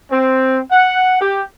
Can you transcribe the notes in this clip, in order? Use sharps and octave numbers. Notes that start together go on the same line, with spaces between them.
C4
F#5
G4